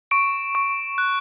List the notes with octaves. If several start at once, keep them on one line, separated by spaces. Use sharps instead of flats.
C#6 D7
C#6
F#6